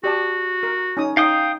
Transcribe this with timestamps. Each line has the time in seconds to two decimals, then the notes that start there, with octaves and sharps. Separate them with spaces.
0.04 F#4 G4 D5 A5
0.63 A#4
0.97 C#4 D#4 D#6
1.17 D#4 F5 G5 D#6